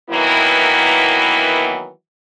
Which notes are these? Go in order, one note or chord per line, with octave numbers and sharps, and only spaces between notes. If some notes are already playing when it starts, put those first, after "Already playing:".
D#3 E3 F#3 A#3 B3 E4